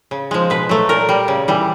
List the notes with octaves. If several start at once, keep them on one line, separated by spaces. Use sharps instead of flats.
C#3
F3 G#3
B2 B4
F#3 A3
A#2 A#4
G3
C#3
E3 G3